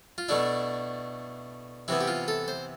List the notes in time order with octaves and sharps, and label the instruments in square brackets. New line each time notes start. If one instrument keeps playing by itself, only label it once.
[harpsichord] F4
B2 A3 D4 E4
C3 E3 B3 E4
G4
F4
A4
C5